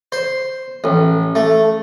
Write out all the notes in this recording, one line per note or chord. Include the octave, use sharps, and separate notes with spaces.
C5
A1
A3